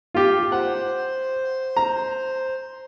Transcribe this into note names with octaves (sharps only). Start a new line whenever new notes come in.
F4 G4
C5 F#5
A#5